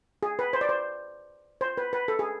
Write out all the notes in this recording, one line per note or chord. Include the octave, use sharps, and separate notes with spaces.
G#4
B4
C5
D5
C5
C5
B4
B4
A4
G#4